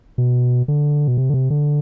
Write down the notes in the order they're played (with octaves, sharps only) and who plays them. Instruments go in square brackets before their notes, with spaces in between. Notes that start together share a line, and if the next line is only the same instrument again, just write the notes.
[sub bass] B2
D3
B2
C3
D3
C3
D3